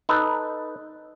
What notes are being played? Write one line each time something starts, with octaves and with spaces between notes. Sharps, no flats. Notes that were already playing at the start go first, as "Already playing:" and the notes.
D#4 A4 B4